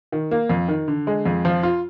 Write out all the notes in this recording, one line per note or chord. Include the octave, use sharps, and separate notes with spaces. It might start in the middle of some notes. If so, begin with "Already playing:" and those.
D#3
A#3
F2
D#3
D3
G#3
F2
F3
F4